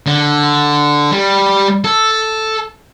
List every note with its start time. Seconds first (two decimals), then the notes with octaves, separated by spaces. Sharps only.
0.06 D3
1.12 G3
1.84 A4